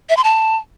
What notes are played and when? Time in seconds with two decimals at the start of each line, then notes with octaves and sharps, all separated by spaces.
0.09 E5
0.17 C6
0.24 A5